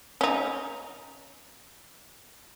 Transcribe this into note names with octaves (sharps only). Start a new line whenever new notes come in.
C#4 D#4